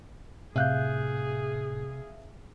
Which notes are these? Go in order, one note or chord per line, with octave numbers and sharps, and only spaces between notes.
A2 C3 G#4 E5 F5 F#6 G6